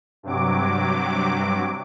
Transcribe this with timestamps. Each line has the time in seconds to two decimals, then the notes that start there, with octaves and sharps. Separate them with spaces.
0.23 G2 C3 F#3 D6